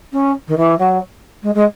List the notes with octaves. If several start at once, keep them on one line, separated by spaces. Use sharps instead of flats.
C#4
D#3
E3
F#3
G#3
G#3